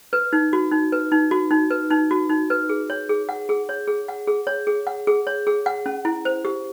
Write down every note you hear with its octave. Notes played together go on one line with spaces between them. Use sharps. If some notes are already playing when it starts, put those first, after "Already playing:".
B4
D#4
F#4
D#4
B4
D#4
F#4
D#4
B4
D#4
F#4
D#4
B4
G#4
C#5
G#4
F#5
G#4
C#5
G#4
F#5
G#4
C#5
G#4
F#5
G#4
C#5
G#4
F#5
C#4
E4
C5
G4